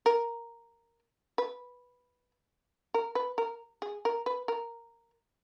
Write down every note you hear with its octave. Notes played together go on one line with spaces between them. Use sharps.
A#4
B4
A#4
B4
A#4
G#4
A#4
B4
A#4